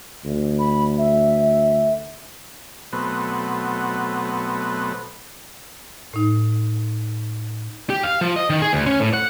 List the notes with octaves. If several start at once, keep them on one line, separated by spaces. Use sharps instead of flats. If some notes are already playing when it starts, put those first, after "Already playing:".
D2
B5
E5
B2 F#3 A3 B3 C4
A2 D#4
G4
F5
F3
D#5
D#3
G#4
D2
C#4
A2
F#5